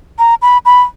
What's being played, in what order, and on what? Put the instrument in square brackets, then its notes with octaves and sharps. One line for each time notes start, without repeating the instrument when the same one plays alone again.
[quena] A#5
B5
B5